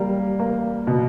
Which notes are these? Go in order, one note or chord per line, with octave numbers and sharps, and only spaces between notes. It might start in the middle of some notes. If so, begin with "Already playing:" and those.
Already playing: G3 A#3
A#3
B2